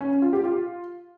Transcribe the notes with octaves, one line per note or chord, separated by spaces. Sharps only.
C#4
C#4
F4
G4
F4